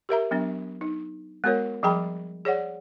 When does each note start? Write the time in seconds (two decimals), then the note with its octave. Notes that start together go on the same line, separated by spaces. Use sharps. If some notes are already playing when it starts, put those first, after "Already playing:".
0.09 G4 A#4 E5 A#5
0.31 F#3 B3 D4
0.81 D#4
1.44 G#3 B3 F#4 A#4 C#5
1.83 F3 G3 G#4 G5 A#5 B5
2.45 G#4 C#5 D5 F#5